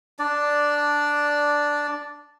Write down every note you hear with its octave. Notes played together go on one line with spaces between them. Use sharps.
D4 D5